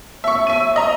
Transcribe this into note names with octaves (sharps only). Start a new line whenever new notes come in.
E5 C#6
E5 D#7
D#5 A#5